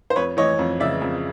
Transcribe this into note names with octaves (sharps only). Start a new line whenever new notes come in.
C5
F2 B4 C#5
E3 C#5 D#5
F2
C#3 D5 E5
F2